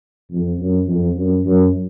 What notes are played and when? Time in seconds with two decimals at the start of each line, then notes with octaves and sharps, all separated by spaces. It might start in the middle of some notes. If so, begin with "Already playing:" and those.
0.31 F2
0.59 F#2
0.88 F2
1.16 F#2
1.45 F#2